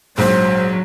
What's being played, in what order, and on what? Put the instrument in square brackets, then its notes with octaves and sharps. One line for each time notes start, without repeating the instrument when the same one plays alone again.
[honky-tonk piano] A#1 G#2 [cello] F#3 [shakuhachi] C5